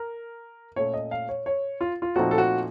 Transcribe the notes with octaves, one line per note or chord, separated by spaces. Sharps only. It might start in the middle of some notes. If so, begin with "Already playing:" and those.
Already playing: A#4
A#2 A3 C#4 C#5
D#5
F5
C#5
C#5
F4
F4
A#2 F3 A3 C4 D#4 F#4
A4
F#4